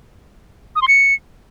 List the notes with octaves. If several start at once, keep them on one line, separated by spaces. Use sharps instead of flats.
D#6
C6
C#7